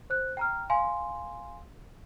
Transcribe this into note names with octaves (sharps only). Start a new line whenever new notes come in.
C5 F#6
G5 A#5 F6
F5 G#5 C6